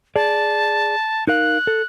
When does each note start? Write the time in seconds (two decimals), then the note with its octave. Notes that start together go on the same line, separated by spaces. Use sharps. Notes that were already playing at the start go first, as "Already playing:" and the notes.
0.16 G#4 D5 A5
1.27 D#4 A#4 F5 F#6
1.67 A4